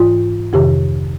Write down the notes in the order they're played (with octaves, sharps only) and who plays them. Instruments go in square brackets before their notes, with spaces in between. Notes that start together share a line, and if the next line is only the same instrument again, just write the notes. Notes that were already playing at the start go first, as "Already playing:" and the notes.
Already playing: [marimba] G#2 E3 F4
F2 C3 D#3 G4